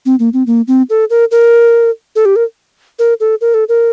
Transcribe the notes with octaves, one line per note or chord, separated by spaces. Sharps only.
C4
A#3
C4
A#3
C4
A4
A#4
A#4
A4
G4
A#4
A#4
A4
A#4
A4
A#4